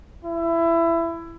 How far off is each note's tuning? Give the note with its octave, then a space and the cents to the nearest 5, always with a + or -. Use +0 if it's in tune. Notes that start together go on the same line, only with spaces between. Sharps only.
E4 +20